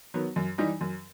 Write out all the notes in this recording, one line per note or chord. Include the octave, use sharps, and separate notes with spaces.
D#3 F#3 B3
F#2
E3 G3 D#4
F#2